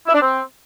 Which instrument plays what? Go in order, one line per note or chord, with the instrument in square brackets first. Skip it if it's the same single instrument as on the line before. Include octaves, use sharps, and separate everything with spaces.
[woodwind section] E4
D4
C4